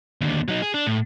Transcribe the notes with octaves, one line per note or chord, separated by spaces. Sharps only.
D#2 D3
F#3 D#4
G#4
D4
A2